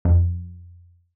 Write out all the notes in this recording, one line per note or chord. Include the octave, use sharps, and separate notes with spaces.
F2